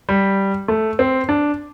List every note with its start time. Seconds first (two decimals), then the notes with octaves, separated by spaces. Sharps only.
0.09 G3
0.68 A3
0.99 C4
1.29 D4